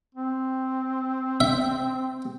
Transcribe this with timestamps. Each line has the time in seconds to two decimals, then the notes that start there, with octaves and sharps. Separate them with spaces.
0.15 C4
1.40 E5